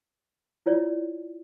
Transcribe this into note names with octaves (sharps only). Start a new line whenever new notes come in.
E4 F4 C#5 D5